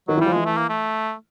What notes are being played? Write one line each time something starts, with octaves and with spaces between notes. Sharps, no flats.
D#3 F#3 D#4
E3 E4
G3
F3 F4
E3 G#3 E4
A3
A#3
A3